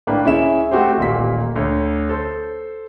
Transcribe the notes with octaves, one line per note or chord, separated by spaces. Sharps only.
A2 A#3 D4 B4 G5
C#2 C#4 E4 G#4 E5 E7
A3 C4 F#4 G4 C5
D#1 A1 A#2 A#3 B6
D2 C#5
A4 C5